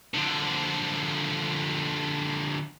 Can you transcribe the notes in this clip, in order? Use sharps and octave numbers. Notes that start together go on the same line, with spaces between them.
D3 F3